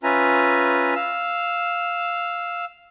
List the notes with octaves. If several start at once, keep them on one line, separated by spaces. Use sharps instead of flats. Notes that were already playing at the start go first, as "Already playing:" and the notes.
C#4 F4 B4 E5 G#5 A#5
F5 E6